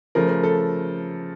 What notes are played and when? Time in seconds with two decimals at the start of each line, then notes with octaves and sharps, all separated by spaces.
0.15 C#3 F3 A3 A#4
0.29 A#4
0.43 A4